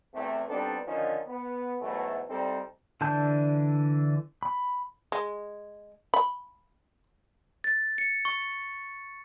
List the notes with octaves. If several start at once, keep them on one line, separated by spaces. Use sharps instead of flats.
E2 C3 A3
G3 B3 C4 D4 D#4 A4
D3 D#3 F3 C#4 D#4
B3
G#2 B2 E3 F#3 A3
C2 G3 C4 D#4 A4
D3 E3 D4 A5 G6
B5
G#3
B5
A6
C#7
C#6